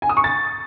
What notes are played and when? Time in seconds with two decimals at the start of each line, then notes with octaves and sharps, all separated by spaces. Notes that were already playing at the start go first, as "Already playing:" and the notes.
0.02 G#5
0.09 D#6
0.17 C#6
0.24 A6